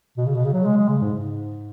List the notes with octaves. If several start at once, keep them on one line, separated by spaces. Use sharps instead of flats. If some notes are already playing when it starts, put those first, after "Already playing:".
B2
C#3
B2
C#3
F#3
G#3
G#3
C#3
G#2
G#2